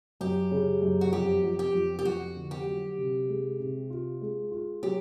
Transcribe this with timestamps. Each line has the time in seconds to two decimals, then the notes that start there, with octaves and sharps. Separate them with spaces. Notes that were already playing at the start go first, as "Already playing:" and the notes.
0.21 F#2 G4
0.51 C#3
0.82 F#2
1.01 F#4
1.12 F2 G4
1.44 F2
1.59 G4
1.75 F2
1.99 G4
2.05 F2 F#4
2.36 D3
2.51 G4
2.66 F#3
2.98 C3
3.29 G#3
3.60 C3
3.90 F4
4.21 G#3
4.52 F4
4.83 F#3 G4